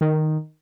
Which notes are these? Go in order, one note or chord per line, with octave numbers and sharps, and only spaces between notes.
D#3